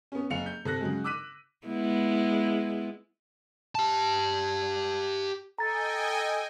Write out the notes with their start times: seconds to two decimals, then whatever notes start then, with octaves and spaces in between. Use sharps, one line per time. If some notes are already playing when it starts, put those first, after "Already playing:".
0.12 B3 C#4
0.30 F#1 F5 C#7 F7
0.46 G6
0.65 C3 A4 F#6 A#6
0.81 C#3 F#3 G#3
1.04 D6 E6 F#6 B6 D#7
1.67 G#3 B3 E4
3.75 G4 A5
5.58 A4 D#5 G5 G#5 A#5 A6